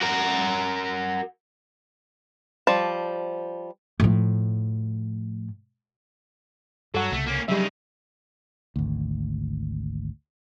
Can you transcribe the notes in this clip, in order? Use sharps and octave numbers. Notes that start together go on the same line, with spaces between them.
F#4 A#4
F3 G3 A5
A2 F3
G2 F#3 A4 F#5
C2 C#3 A3
A#3 C#4
C#3 F#3 G3 D#4 E5
G#1 D2